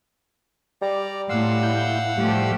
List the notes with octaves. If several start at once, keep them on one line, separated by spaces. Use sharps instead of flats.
G3 D5 A#5
A2 F5 F#5 C6 E6
E4 G6
A2 F3 G3 A3 G4